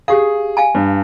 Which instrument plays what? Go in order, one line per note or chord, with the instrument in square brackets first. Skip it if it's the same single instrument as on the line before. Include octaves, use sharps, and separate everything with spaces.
[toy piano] G4 F5 [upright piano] G#4
[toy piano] F5 G#5 A5
[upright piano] G2